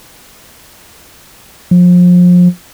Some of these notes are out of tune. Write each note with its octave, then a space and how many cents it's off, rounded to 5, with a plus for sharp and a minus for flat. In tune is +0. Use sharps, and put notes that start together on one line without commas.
F3 +30